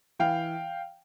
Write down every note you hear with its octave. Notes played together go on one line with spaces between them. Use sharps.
E3 F5 G5